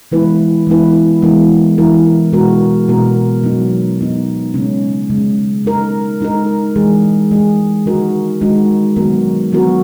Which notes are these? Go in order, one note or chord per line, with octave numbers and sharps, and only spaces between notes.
E3 G#3 B3 E4 B4
E3 G#3 B3 E4 B4
E3 G#3 B3 E4 A#4
E3 G#3 B3 E4 A#4
B2 G#3 B3 F#4 A#4
B2 G#3 B3 F#4 A#4
F#3 B3 D#4
F#3 B3 D#4
C#3 G#3 C#4
C#3 G#3 C#4
G#3 D#4 A#4
G#3 D#4 A#4
E3 G#3 D#4 G#4
E3 G#3 D#4 G#4
D#3 G#3 D#4 F#4 A#4
D#3 G#3 D#4 F#4 A#4
D#3 F#3 B3 F#4 A#4
D#3 F#3 B3 F#4 A#4